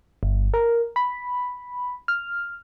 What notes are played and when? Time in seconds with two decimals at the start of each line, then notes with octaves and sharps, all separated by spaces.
0.23 G1
0.54 A#4
0.96 B5
2.08 F6